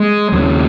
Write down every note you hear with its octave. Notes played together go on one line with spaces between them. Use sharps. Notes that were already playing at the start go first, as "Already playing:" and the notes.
Already playing: G#3
D#2 C#3 F#3